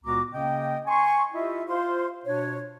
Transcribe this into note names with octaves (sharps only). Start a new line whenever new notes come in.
C#2 A#2 B3 F#4 A#5 D6
C#3 A#3 C#4 D#5 G5
G#5 C6 C#6
E4 F4 G4 D#5 E5
F4 C5 F5 C6
B2 D4 C#5